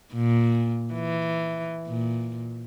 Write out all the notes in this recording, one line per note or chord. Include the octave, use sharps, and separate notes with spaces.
A#2
E3
A#2